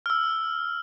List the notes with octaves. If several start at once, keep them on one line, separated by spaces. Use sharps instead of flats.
E6 F6